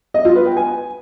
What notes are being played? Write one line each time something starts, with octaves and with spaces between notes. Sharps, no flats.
D#5
F4
B4
G5
G#5